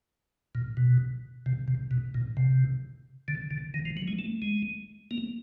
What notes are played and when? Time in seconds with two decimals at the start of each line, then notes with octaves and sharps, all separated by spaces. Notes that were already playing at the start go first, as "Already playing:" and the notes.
0.55 A#2
0.77 B2
1.46 C3
1.68 C3
1.91 B2
2.14 A#2
2.37 C3
3.28 D3
3.51 D3
3.74 D#3
3.85 F3
3.97 F#3
4.08 G#3
4.19 A3
4.42 G#3
5.11 A#3